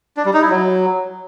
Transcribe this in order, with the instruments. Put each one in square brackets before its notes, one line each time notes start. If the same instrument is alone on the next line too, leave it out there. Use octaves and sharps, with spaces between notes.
[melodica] D4
G3
D#4
E4
F#3